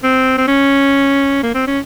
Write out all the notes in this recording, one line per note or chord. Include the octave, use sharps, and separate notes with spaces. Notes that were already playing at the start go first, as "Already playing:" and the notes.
C4
C4
C#4
A#3
C4
C#4